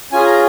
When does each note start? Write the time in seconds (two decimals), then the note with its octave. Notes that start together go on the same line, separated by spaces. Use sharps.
0.12 C#4 F4 G#4 G#5
0.26 A#5